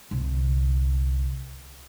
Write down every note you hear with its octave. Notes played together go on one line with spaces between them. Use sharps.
C2 D3